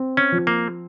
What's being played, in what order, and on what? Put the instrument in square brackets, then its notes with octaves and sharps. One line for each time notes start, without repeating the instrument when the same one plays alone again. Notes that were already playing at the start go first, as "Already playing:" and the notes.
Already playing: [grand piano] C4
[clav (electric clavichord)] C#4
[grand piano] F3
[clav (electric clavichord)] A#3